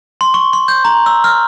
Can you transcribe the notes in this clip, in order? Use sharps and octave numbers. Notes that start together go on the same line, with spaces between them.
C6
C#6
C6
G6
A#5
E6
F6